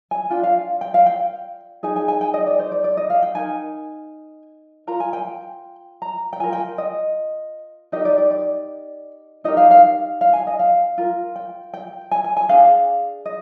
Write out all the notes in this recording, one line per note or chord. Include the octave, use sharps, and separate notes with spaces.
G#5
D4 F4 G5
F5
G5
F5
G5
D#4 G#4 G#5
G#5
G#5
G5
D#5
D5
C5
D5
D5
D#5
F5
G5
D#4 A#4 G#5
F4 A#4 A#5
G#5
G5
A#5
G5
F4 A#4 G#5
G5
D#5
D#4 G4 A#4 D#5
D5
D5
D5
D#4 G4 A#4 D#5
F5
F5
F5
G#5
D#5
F5
F4 A#4
G5
G5
G#5
G#5
G#5
D4 G#4 F5
D#5